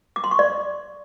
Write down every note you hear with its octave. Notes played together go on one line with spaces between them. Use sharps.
D6
C6
C#6
D5